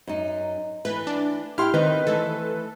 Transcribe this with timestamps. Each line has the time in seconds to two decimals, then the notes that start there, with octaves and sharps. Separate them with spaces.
0.07 F#2 D#4
0.85 E3 A3 B4
1.07 D4
1.58 E4 G4 F#5 G5 C6 F6
1.74 D#3 C4 D#4 B4
2.07 E3 A3 A4